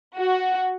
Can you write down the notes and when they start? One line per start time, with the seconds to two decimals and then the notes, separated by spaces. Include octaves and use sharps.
0.19 F#4